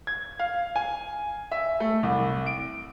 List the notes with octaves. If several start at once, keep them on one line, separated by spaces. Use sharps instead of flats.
G#6
F5
G#5
E5
A3
C2
D7